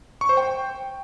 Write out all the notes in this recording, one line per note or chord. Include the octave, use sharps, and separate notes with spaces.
C#6
C5
G5